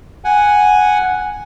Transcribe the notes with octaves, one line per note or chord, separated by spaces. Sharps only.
F#5 G#5